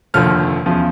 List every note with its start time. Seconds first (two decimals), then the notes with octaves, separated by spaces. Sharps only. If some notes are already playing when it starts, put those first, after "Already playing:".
0.14 F1 D#2 D3 F3 F6
0.66 E2 C#3 F3